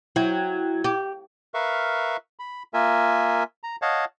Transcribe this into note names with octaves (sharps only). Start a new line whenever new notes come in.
F#3 E4 G5 G#6
G4
A#4 B4 E5 F5 C#6
B5
A#3 F4 A#4 E5 G#5
A#5
C#5 D#5 F5 F#5 A5